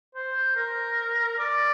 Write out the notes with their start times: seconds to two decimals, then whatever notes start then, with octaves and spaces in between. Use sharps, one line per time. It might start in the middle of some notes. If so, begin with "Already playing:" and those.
0.15 C5
0.56 A#4
1.39 D5